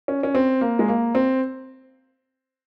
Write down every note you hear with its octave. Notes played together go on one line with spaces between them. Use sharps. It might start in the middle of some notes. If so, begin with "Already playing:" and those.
C#4
C#4
C4
A#3
G#3
A#3
C4